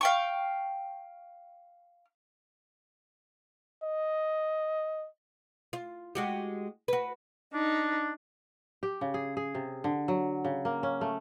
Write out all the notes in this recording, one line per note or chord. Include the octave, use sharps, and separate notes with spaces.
F5 G5 C#6
D#5
F4
G#3 F#4 G4
F#4 B4
D4 D#4
G4
C#3
G#4
G#4
C3
D3
F#3
C#3
A#3
C#4
A3